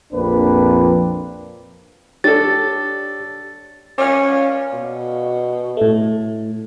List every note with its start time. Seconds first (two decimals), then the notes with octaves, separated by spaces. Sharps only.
0.13 A#1 F2 A#3 C4 D4 B4
2.24 D4 G4 A4 C#5 A6
3.98 C#4 D5 F5
4.73 B2
5.77 A2 A3